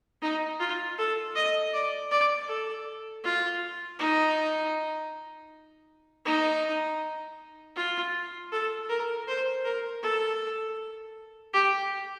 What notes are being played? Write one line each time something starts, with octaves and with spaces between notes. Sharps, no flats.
D#4
F4
A4
D#5
D5
D5
A4
F4
D#4
D#4
F4
A4
A#4
C5
A#4
A4
G4